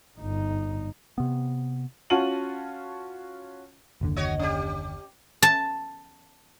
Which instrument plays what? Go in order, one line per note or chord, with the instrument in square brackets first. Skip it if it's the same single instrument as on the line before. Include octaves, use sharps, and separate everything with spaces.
[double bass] G1 D#4
[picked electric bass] C3 B3
[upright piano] C#4 F4 F#4 A5 D#7 F#7
[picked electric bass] F#1 D#2 D3
[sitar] F#4 C#5 D#5
C#4 G4
[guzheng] A5